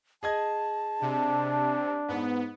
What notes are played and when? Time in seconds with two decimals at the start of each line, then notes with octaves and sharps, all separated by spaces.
0.23 G#4 D#5 A5 G#6
1.02 C3 D4
2.09 G#2 B3